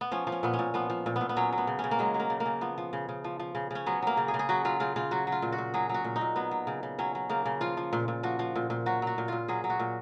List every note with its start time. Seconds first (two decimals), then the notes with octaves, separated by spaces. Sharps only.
0.01 B3
0.12 F3 C#4
0.27 F3
0.32 C#4
0.43 A#2 B3
0.53 C#4
0.59 A#2
0.74 F3 B3
0.90 F3
1.06 A#2
1.16 B3
1.21 A#2
1.29 B3
1.36 F#3 C#4
1.52 F#3
1.58 B3
1.67 C#3
1.79 C#4
1.84 C#3
1.91 A#3
1.99 F#3 G#3
2.14 F#3
2.20 A#3
2.30 C#3
2.40 A#3
2.46 C#3
2.61 F3 B3
2.78 F3
2.93 C#3
3.09 C#3
3.24 F3
3.39 F3
3.55 C#3
3.71 C#3 C#4
3.86 F#3 B3
4.02 F#3 A#3
4.17 C#3
4.28 G#4
4.34 C#3
4.39 G#4
4.49 F#3 F#4
4.65 F#3 F4
4.80 C#3 F4
4.96 C#3 F4
5.11 F#3 F#4
5.27 F#3
5.32 F4
5.42 A#2
5.52 F#4
5.58 A#2
5.74 F#3 G#4
5.89 F#3 F#4
6.04 A#2
6.16 D#4
6.21 A#2
6.36 F#3 B3
6.51 F#3
6.67 C#3
6.83 C#3
6.99 F#3 C#4
7.15 F#3
7.29 C#3 A#3
7.46 C#3
7.61 F3 F4
7.77 F3
7.93 A#2
8.08 A#2
8.23 F3 F#4
8.39 F3
8.56 A#2
8.70 A#2
8.86 F#3 F#4
9.02 F#3 F#4
9.18 A#2
9.28 A#2 F4
9.48 F#3 G#4
9.64 F#3
9.70 F#4
9.79 A#2